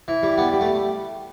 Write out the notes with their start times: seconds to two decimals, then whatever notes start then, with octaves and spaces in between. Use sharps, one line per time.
0.08 E3
0.23 G3
0.38 G3 B3
0.53 G3
0.61 A3